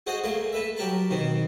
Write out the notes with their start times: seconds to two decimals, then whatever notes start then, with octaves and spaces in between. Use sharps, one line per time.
0.07 F#4 G#4 C5 D#5 F#5
0.24 A3 A#3 G#4 C6
0.53 A4 B4 E5
0.77 F#3 G4 A#4 A5 B5
1.11 B2 D#3 C4